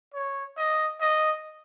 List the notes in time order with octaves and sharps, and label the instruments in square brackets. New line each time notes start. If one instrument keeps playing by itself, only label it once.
[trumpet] C#5
D#5
D#5